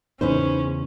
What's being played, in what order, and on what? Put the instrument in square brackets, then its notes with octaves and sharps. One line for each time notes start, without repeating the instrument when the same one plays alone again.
[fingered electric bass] E2 C#3 [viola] C#4 [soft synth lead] D#4 [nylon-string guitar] G#4 B4 C5